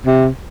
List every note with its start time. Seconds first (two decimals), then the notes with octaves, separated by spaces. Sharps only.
0.06 C3